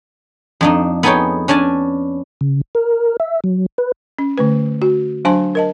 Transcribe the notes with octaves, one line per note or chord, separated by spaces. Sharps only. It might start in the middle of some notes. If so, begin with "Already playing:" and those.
F2 D4 D#4
B3 D#4 G#4 A4 C#5 G5
C#4 D4 G#5 A5
C#3
A#4
E5
F#3
B4
C#4
D3 A3 B4
F#4
F#3 D4 C5 G#5 A5 C6
A#4 D#5 A5